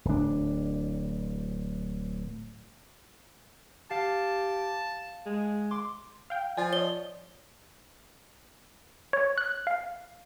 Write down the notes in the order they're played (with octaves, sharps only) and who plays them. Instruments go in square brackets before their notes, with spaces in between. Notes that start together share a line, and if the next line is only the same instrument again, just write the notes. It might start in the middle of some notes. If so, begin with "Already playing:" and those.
[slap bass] D1 D4
[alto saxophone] G4 [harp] F5 [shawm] A5
[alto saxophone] G#3
[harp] C6 D6
[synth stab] F5 G5
[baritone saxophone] F3 [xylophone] D5 [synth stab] G#5 A6
[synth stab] C#5 D#5 [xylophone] G7
[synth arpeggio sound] C#5
F#6
F5